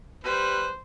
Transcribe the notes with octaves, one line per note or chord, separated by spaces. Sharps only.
G3 B4 C5